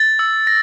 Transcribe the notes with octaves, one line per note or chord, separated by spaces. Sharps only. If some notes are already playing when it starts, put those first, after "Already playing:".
Already playing: A6
E6
A#6